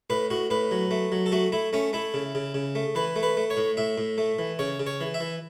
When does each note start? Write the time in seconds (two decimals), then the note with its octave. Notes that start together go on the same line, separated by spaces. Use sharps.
0.10 A2 B4
0.30 A2 F#4
0.50 A2 B4
0.71 F#3
0.91 A3
1.12 F#3
1.26 A4
1.32 A3 F#4
1.52 A3 E4
1.73 A3 C#4
1.93 A3 E4
2.14 C#3
2.35 C#3
2.54 C#3
2.75 A3
2.95 E3 B4
3.16 A3
3.23 B4
3.37 A3
3.50 C#5
3.57 A2
3.77 A2 E5
3.98 A2
4.18 A3
4.39 E3
4.59 C#3 C#5
4.80 C#3
4.87 C#5
5.01 E3
5.14 E5
5.21 E3